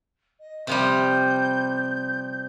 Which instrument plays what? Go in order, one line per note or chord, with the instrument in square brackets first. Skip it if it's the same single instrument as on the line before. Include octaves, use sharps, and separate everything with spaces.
[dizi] D#5
[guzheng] C3 F3 G3 [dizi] G6